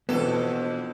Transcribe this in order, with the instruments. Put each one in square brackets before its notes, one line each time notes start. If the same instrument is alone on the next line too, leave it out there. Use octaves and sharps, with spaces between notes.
[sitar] F2 A4 [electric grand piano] B2 E3 D4 [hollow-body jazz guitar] B3